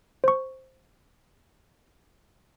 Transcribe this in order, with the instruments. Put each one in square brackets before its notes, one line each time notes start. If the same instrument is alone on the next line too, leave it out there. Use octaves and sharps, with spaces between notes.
[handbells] C5 C#6